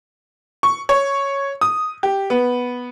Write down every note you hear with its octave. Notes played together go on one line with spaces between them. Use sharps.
C#6
C#5
D#6
G4
B3